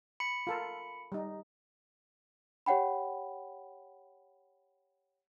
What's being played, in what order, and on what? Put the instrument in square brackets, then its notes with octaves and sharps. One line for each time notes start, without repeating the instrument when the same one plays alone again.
[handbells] B5 C#7
[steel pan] F4 A4 A#4
G3 D#4
[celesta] G4 C#5 F#5 G5 B5